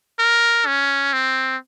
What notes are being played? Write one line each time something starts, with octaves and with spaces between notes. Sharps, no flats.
A#4
C#4
C4